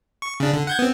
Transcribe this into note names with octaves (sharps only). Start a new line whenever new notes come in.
C#6
C#3 D4
D3
F#5 G6 G#6
B3 C4